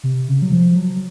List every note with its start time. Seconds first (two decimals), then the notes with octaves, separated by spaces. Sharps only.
0.04 C3
0.28 C#3
0.42 F#3
0.52 F3
0.76 F#3